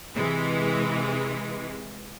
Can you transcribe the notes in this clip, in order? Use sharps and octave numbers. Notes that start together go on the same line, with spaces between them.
C3 E3 G#3